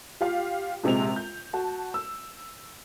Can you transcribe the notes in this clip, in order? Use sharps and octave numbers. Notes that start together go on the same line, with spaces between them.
F4 G4 F5
A#1 C3 G#3 C4 F7
G6
F#4 A5
E6